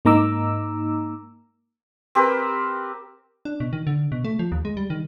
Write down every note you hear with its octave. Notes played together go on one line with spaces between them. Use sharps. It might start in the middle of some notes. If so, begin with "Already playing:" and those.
G#2 A#3 D#4 A#5 D6 E6
C4 G4 A#4 B4
D4
B2
D#3
D3
B2
A3
F3
D#2
G#3
G3
D#3